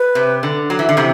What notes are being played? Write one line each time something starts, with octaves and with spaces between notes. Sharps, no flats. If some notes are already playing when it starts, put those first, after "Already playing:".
Already playing: B4
C3
D3
F#3
E3
D3
C3 E3